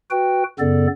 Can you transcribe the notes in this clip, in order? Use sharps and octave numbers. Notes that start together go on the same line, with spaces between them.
F#4 B4 G5
F#2 C#3 B3 A4 D5